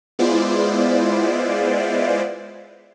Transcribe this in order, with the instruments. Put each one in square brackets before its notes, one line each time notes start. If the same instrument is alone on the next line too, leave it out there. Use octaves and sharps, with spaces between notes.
[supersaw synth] G#3 B3 E4 F4 C5 D5